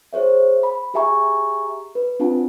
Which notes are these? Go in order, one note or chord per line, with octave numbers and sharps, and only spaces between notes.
G#4 C5 C#5 E5
B5
G4 G#4 E5 G#5 A#5 C#6
B4
C4 D4 F4 F#5 A5